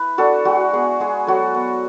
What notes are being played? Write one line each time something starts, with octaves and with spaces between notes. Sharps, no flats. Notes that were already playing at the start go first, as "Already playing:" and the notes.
Already playing: E4 B4
D4 F#4 A4
G#3 F#4
B3 G#4
G#3 G#4
F#3 F#4 A4
B3